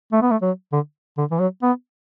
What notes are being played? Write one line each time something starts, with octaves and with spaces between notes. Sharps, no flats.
A3
B3
A3
F#3
D3
D3
E3
F#3
B3